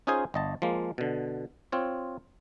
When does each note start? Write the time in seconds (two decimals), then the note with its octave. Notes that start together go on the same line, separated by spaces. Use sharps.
0.07 C#4 D#4 F4 G#4 C5 G#5
0.34 G1 D#5 A5
0.62 F3 G#3 A#3
0.98 B2 D3
1.72 C4 F4 C#5